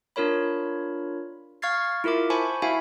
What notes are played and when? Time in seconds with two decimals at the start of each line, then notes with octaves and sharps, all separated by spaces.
0.16 D4 F4 A#4 C#5 B5
1.62 F5 C#6 F6 G#6 A6 C7
2.04 E4 F4 A#4 E5 D6
2.30 C5 G#5 A5 B5 C#6
2.62 E4 F#4 E5 F5 G#5 B5